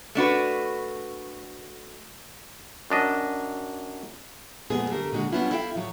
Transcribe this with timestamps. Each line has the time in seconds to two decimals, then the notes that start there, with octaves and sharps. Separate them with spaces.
0.15 A3 D4 F#4 B4
2.90 F#2 D4 D#5
4.70 F2 A#2 G#3 B3 G#4
4.89 D3 G3 A3 A#4
5.12 A#2 D3 G#3 F#4
5.32 G3 B3 C#4 D4 E4 F4
5.51 E4 A4 E5 F5 G5
5.74 A2 F3 F#3